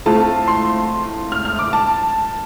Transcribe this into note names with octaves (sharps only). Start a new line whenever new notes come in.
A2 A3 C4 F4 A5
C6
F6
F6
D6
A5